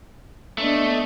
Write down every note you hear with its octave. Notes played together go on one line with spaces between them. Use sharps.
A3 B3 D4 D#5